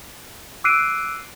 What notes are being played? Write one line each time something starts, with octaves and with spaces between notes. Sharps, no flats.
D6 E6 F#6 C7 D7 D#7